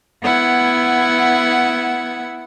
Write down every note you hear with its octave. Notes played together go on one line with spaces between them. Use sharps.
B3 E4 F#5 G#6